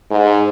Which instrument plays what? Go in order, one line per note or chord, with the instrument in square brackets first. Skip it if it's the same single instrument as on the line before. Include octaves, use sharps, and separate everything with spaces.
[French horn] G#2